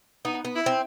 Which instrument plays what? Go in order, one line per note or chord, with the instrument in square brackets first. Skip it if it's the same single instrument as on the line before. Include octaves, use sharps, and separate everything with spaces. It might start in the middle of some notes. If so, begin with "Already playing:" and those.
[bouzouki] B3 [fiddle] D#4
[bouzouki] B3
[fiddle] E4
[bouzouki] C4